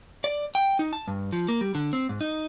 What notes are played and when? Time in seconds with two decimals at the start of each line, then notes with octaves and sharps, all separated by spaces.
0.24 D5
0.55 G5
0.79 D#4
0.93 A5
1.08 G2
1.33 F3
1.48 A#3
1.61 G3
1.75 D3
1.93 C4
2.09 G#2
2.21 D#4